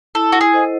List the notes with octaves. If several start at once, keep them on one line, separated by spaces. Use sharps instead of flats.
E4 A4
F#4
G#4
A4 C5 D#5 F#5